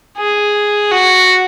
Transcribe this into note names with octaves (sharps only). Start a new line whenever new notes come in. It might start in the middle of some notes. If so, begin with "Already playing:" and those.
G#4
F#4